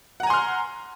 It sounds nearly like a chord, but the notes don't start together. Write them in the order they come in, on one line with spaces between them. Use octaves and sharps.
F#5 A#5 G#5 C6 F6